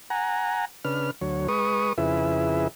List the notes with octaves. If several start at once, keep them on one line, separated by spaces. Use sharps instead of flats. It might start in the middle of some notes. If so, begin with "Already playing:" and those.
F#5 G#5 A#5
C#3 D4 B4 F6
D2 F#3 C#5
G#3 B4 C#6 D#6
F2 C#3 E4 G#4 B4 E5